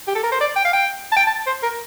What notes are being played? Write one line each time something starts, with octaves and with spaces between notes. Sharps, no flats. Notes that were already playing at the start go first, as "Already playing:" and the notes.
G4
A4
A#4
C5
D5
G5
F5
G5
A5
G5
A5
C5
A#4